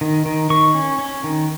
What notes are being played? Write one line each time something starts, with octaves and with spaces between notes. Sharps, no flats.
D#3
D#3
D#3 C#6
C#4
C#4
D#3